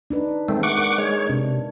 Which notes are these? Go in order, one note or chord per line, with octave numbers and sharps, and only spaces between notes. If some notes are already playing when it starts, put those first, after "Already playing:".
D4 D#4 B4
D#3 G#3 A3 C4
F#5 C#6 D6
A#4
G#3 C#5
C3 D4